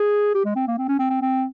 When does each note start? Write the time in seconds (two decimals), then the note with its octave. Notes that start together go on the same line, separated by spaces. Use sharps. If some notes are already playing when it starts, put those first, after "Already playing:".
Already playing: G#4
0.35 G4
0.45 G#3
0.56 C4
0.68 A#3
0.78 C4
0.89 C#4
0.99 C4
1.10 C4
1.22 C4